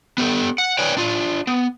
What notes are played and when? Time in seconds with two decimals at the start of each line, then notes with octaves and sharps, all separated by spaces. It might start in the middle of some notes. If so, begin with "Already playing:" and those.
0.18 B3 G4 A4
0.58 F#5
0.79 B4 C#5 D5 G5 G#5
0.97 D4 F4
1.47 B3